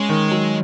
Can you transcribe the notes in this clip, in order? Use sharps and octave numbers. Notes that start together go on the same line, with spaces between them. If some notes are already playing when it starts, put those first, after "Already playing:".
Already playing: G#3 C#4
D#3
F#3